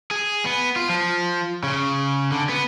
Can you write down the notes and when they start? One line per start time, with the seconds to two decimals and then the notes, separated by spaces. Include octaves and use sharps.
0.11 G#4
0.45 B3
0.76 F4
0.89 F3
1.63 C#3
2.31 D3
2.49 B3